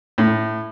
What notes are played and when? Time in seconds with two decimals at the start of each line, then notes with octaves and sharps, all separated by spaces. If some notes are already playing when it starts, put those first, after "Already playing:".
0.18 A2